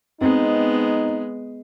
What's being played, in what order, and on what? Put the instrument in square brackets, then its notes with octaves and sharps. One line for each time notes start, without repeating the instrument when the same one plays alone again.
[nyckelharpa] G#3 B3 [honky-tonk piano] C4 [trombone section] D#4